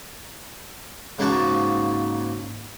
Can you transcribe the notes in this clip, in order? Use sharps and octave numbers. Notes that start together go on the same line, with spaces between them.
G#2 C#3 A#3 F#4 A5 C#6